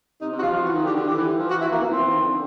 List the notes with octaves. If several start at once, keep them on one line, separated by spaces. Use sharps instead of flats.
C3 D#4
C3
F#4
F3 F4
F3
E3 F#4
D#3
D3 G4
D3
E3 G4
E3
E3
F3
E3 F#4
E3 E4
E3 A#3
E3 B3
F3 C4
E3
D#3
D3